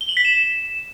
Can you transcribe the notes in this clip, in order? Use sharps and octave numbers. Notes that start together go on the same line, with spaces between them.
G7
F#7
B6
E7